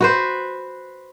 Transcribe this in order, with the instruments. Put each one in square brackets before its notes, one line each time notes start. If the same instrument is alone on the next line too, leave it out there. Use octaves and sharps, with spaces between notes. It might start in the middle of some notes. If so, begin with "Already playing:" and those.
[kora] F#4 B4 C5